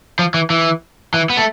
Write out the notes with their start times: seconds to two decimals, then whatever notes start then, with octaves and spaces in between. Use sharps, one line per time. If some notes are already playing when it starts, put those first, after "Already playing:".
0.19 F3
0.34 E3
0.50 E3
1.14 E3
1.30 B3
1.37 A3